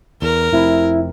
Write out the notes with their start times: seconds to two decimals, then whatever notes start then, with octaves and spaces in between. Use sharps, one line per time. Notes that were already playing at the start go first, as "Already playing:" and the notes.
0.22 E2 A#4
0.52 F1 C3 E4